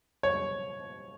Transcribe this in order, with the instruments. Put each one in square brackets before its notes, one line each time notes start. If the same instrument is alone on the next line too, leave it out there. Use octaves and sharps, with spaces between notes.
[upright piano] C#5